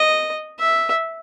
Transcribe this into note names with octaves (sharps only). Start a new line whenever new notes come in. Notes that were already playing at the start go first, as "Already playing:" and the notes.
Already playing: D#5
E5